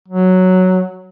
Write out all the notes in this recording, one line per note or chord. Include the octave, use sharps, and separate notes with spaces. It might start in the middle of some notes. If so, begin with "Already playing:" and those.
F#3